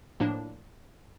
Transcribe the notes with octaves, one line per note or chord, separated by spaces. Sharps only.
A2 F3 A#3 D4